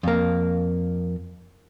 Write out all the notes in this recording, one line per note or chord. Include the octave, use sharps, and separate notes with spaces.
F2 A#3